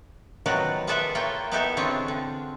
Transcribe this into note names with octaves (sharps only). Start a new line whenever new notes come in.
D#3 F3 F#3 B3 F#4 D5
F4 G#4 A4 B4 D5 E5
A#3 E4 F4 C#5 G5
B3 D#4 E4 G4 A4 E5
D3 E3 C4 F4 G#4 C#5
D3